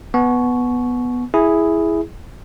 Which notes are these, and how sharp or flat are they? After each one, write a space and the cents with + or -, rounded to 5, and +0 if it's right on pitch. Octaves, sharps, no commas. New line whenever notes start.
B3 +0 A5 -45 C#6 +0
E4 +0 G#4 +0